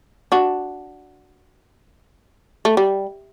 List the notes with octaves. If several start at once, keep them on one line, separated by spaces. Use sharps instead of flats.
D4 F#4
A3
G3